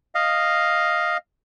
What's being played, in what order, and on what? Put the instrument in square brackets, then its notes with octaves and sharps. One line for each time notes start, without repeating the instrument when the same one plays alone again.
[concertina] D#5 F5